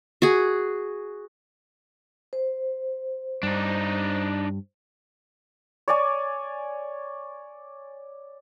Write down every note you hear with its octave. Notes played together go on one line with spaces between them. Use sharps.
F#4 G#4
C5
G2 D4 D#4
C#5 D5 G#5